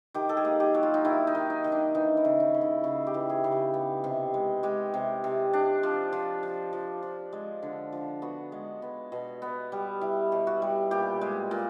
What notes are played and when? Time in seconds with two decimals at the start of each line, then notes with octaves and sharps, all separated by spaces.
0.14 D#3 G4
0.29 A4
0.37 G#4
0.45 A#3
0.60 G4
0.74 F#3
0.83 F4
0.94 D#4
1.05 D#3 E4
1.27 D#4
1.35 D#3
1.50 D#4
1.64 D#3
1.72 D4
1.95 E3 D#4
2.17 E4
2.25 C#3
2.40 D#4
2.54 C#3
2.61 E4
2.84 C#3 F#4
3.07 G4
3.14 E3
3.30 G#4
3.44 C#3
3.52 G4
3.74 B3
4.04 C3
4.34 G#3
4.63 G#3 G4
4.94 C3
5.24 C3
5.53 D4
5.83 F3
6.12 F3
6.43 F3
6.73 F3
7.03 F3
7.33 G#3
7.63 D3
7.92 F3
8.22 B3 F#4
8.52 G#3
8.82 B3
9.12 B2
9.42 B3
9.72 G3
10.01 G3 E4
10.32 B2
10.47 F#4
10.62 G3
10.91 A#2 G4
11.21 G#3
11.51 A#2